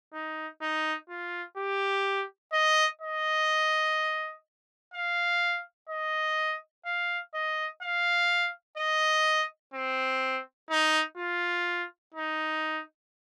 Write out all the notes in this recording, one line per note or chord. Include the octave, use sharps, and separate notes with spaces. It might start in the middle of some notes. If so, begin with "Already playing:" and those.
D#4
D#4
F4
G4
D#5
D#5
F5
D#5
F5
D#5
F5
D#5
C4
D#4
F4
D#4